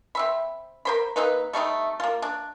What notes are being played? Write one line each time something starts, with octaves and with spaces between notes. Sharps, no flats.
C4 E5 B5
A#4 C5 B5
A#3 C4 D#4 B4
G3 A3 C4 D#4
A#3 F4
D4